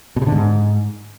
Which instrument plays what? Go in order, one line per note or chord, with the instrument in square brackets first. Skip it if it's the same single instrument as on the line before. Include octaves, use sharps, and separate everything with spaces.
[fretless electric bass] B2
C3
D3
G#2